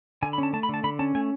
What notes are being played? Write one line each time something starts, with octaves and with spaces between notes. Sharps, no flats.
D3 G#5
B5
C#4
A5
A3 A5
B5
D3 A5
D3 B5
C#4 A5
A3 G#5